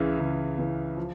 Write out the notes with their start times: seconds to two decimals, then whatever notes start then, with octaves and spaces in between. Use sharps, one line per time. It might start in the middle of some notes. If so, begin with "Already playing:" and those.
Already playing: C#2 C#3 E3
0.20 C#2
0.58 C#3 E3
0.97 F3